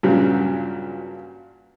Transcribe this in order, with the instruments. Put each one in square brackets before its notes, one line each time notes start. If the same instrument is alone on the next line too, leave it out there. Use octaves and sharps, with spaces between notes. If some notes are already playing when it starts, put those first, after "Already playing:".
[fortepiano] G2 A#2 C#3 F#3